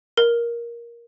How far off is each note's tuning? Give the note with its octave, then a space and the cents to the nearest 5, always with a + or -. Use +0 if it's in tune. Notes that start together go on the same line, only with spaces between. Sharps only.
A#4 +10